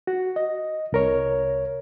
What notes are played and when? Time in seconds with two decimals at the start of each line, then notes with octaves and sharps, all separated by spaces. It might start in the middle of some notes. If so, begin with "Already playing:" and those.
0.07 F#4
0.36 D#5
0.92 C2 A#4 C#5